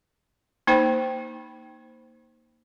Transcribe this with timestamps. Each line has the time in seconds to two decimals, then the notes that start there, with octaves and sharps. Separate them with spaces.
0.67 A#3 D#4 C5 G5 B5